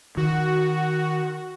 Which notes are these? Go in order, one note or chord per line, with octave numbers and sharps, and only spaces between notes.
D#3 F#4